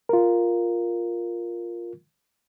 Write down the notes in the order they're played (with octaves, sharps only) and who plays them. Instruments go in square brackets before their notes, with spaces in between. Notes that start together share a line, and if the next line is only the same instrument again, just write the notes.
[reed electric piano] F4 A#4